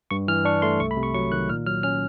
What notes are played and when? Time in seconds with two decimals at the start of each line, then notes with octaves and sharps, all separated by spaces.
0.11 G2 C#6
0.28 E3 F6
0.45 D4 C#6
0.62 A3 C6
0.80 C2 C#6
0.91 B5
0.97 C3
1.03 C#6
1.14 F#3 C#6
1.32 D#3 F#6
1.49 A#2 F6
1.66 F#3 F6
1.83 C#4 F6